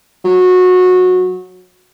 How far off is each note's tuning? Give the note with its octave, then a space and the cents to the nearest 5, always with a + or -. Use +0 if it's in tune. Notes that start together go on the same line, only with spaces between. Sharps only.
F#3 -20